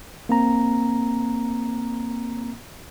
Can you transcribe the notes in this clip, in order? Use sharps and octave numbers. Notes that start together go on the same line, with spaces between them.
A#3 C4 A#5